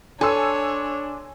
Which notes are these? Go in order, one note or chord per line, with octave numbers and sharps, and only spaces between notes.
D4 A4 C#5 G#5 C6 E6